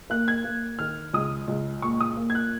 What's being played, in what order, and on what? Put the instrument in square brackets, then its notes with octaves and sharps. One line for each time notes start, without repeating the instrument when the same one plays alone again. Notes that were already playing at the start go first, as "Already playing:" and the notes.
[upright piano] A#3 F#6
G#6
A#3
D#3 F6
C#2 D#6
C#2
A#2 C#6
D#6
A#3
G#6
F#6